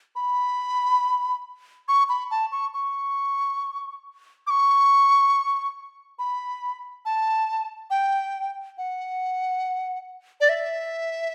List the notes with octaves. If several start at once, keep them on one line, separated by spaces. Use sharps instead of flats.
B5
C#6
B5
A5
C#6
C#6
D6
C#6
B5
A5
G5
F#5
D5
E5